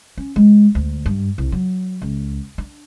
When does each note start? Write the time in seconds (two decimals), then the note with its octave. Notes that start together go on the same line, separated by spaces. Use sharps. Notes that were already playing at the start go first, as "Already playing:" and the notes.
0.17 C#4
0.36 G#3
0.75 D2
1.06 G2
1.38 C2
1.52 F#3
2.02 C#2
2.58 D4